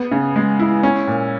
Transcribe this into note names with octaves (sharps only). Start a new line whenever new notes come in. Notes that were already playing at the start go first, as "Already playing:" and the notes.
Already playing: B3
C#3
G#3
E4
C#4
A#2